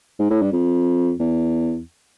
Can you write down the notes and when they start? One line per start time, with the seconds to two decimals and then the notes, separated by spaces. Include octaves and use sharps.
0.19 G#2
0.30 A2
0.42 G2
0.53 F2
1.20 E2